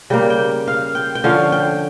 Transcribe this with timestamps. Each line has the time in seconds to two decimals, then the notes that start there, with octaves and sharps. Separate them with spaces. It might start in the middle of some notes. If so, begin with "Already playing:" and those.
0.10 C#3 G3 A#3 G5
0.30 G5
0.68 F5
0.95 G5
1.15 G5
1.24 D3 F3 C#4 F5
1.52 G5